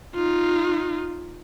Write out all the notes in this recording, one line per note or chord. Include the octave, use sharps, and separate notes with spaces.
D#4 F4